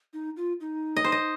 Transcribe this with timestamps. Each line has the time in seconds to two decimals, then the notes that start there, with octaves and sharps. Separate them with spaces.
0.13 D#4
0.37 F4
0.61 D#4
0.96 D#5
1.04 C5
1.12 D#5